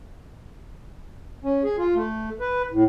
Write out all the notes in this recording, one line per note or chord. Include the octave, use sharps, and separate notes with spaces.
C#4
G#4
F4
A3
B4
A2